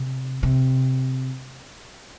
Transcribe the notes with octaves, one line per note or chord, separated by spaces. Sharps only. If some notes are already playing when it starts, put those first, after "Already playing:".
Already playing: C3
C3